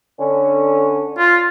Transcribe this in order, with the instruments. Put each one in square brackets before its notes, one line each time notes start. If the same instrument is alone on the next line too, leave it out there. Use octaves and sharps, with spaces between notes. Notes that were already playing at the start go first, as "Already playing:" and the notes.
[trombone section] D3 C#4
[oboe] F4